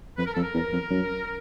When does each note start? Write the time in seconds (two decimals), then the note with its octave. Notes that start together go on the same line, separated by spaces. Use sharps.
0.18 F2 B4
0.25 A#4
0.34 F2 A4
0.42 A#4
0.54 E2
0.72 F2
0.90 F#2